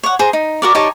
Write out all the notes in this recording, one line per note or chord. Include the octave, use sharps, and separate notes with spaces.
C#5 F#5
G#4 C5 A#5
D#4
F#4 A#4 D5
D#4 G4 C#5 A5